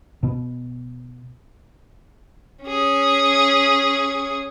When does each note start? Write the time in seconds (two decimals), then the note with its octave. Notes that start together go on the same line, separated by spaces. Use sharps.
0.23 B2 B3
2.64 C#4 G#4